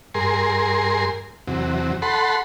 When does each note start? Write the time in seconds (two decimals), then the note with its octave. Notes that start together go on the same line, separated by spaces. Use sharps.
0.14 G2 G#4 A#4 C6
1.48 E2 C3 F#3
2.02 A4 F#5 B5 C6